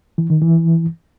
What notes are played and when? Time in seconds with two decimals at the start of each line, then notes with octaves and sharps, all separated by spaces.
0.18 E3
0.30 D#3
0.42 E3